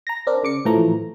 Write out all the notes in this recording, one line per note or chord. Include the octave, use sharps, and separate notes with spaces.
A#5 A#6
C4 D4 A#4
C#3 D6 C#7
A2 E3 F3 A3 A#5